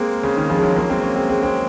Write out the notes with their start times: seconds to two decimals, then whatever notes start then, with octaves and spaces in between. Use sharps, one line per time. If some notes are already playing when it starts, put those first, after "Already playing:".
Already playing: G#3 A#3 C4
0.23 C#3
0.37 D#3
0.50 C#3 F3
0.58 G#3
0.63 D#3 F#3
0.76 F#3 A#3
0.90 G#3 C4
1.03 A#3 C#4
1.16 G#3 C4
1.29 G#3 C4
1.43 G#3 C4